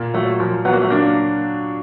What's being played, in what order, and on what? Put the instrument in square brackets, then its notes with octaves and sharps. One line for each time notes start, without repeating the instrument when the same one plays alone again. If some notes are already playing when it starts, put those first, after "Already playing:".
Already playing: [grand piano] A#2
[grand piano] F#3 [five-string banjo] A3
[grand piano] A#2 [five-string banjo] F3
[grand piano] F#3 [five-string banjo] B3
[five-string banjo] A#3
A3
[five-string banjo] A#3 [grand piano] D4